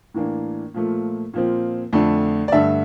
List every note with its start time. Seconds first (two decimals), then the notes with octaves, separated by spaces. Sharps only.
0.14 A2 E3 A#3 D4
0.74 A#2 F3 A3
1.34 A#2 F3 C4
1.93 F2 D3 A3 D4
2.48 D5
2.52 G2 D3 A3 D4 E5